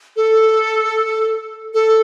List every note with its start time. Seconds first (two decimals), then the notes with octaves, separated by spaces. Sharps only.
0.16 A4
1.74 A4